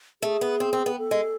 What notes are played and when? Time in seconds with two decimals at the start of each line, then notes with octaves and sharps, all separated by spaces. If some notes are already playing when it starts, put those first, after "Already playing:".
0.22 A3 G#4
0.41 B3
0.60 C4
0.73 C4
0.86 B3
0.99 A4
1.11 G#3